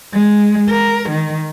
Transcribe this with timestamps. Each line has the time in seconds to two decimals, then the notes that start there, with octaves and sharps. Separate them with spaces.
0.14 G#3
0.69 A#4
1.09 D#3